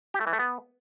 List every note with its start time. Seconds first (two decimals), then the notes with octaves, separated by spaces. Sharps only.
0.14 G4
0.20 A3
0.27 E3
0.33 A3
0.39 B3